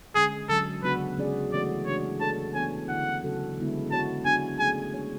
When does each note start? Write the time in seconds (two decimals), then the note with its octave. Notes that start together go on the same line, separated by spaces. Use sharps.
0.15 D3 G#3 C#4 G#4
0.49 D3 F#3 C#4 A4
0.83 C#3 F#3 B3 D4 F#4 B4
1.18 C#3 G#3 C#4 G#4 D5
1.52 E3 A3 C#4 F#4 C#5 D5
1.86 C#3 E3 G#3 D4 F#4 C#5
2.20 A3 D4 A4 C#5 A5
2.54 E3 B3 D4 A4 C#5 G#5
2.89 D3 A3 C#4 E4 F#5
3.23 C#3 F#3 C#4 F#4 A4
3.57 D3 G#3 B3 E4
3.91 B3 F#4 C#5 A5
4.25 B3 D4 F#4 G#5
4.59 A3 C#4 G#4 G#5
4.94 G#3 D4 G#4 C#5